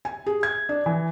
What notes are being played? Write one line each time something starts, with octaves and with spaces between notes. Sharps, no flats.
G#5
G#4
G#6
D4
E3